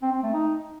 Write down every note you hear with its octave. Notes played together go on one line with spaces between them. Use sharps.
C4
C4
A3
D#4